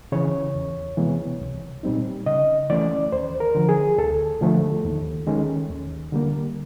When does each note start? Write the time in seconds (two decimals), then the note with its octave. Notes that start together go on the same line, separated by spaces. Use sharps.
0.12 C#3 E3 C#5
0.55 E2
0.97 C3 E3 G#3 B3
1.41 C2
1.83 A#2 G3 C4 D#4
2.26 C#3 D#5
2.70 E3 A3 C#4 D5
3.12 D#2 C5
3.40 A#4
3.55 D3 F3
3.69 G#4
3.98 D2 A4
4.41 D3 F3 A3
4.84 D#2
5.27 D#3 G#3 C#4
5.69 D#2
6.12 D3 G3 A#3